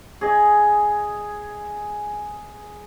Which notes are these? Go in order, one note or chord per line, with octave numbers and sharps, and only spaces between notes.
G#4 D#5